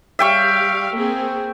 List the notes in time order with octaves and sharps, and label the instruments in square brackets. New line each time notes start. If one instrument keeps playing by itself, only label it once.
[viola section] G3 F5 [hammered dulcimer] E5 G5 C#6
[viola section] A#3 C4 G#4